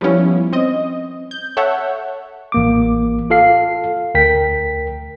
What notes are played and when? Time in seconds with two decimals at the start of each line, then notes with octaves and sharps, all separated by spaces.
0.01 F3 G3 B3 C#4 E4
0.53 C4 D#5
1.31 G6
1.57 A4 C#5 E5 F#5
2.52 A1 A#3 D6
3.30 F4 A4 F5 C7
4.15 D2 A#4 G5 B6